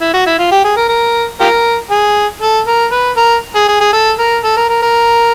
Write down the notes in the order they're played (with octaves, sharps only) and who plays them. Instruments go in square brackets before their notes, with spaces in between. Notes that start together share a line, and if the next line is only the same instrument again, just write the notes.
[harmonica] E4
F#4
E4
F4
G4
G#4
A#4
A#4
F4 G4 A#4
G#4
A4
A#4
B4
A#4
G#4
G#4
G#4
A4
A#4
A4
A#4
A#4
A#4